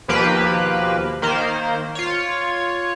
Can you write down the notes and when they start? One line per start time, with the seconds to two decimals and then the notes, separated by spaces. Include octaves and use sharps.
0.08 D#2 B2 F3 A#3 G4 B4
1.22 D#3 A#3 C5
1.95 F4 C#5